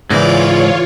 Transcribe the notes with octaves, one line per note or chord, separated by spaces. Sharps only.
C#2 G#2 E3 F4 C#5 D5